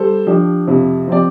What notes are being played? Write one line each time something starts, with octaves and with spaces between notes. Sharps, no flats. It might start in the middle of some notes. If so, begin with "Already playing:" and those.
Already playing: G3 A4 C5
F3 D4 G4
F2 C3 F3
F3 C4 G4 D5